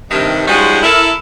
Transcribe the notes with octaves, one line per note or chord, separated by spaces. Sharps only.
G2 C3 D#3
F3 G3 G#3 C#4 D#4 F#4
E4 A4 A#4